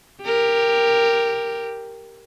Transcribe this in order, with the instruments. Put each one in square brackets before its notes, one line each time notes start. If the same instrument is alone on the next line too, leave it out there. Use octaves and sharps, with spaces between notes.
[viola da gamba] G4 A#4